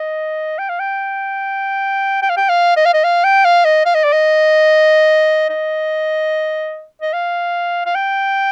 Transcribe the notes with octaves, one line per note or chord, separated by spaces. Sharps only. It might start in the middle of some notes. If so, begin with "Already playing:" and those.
Already playing: D#5
G5
F5
G5
G5
F5
G5
F5
D#5
F5
D#5
F5
G5
F5
D#5
F5
D#5
D5
D#5
D#5
D#5
F5
F5
G5